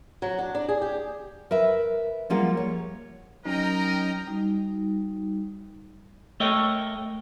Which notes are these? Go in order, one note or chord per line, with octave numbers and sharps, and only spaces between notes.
F#3
D4
D4
G#4
G4
A#4 B4 E5
F3 G3 A#3 F4 G#4 F#5
C#5
F#3 C#4 D#4 A#4 D#5 G5 A#5
G3 D#4 F#4
A3 A4 A#4 C#5 D#5 G5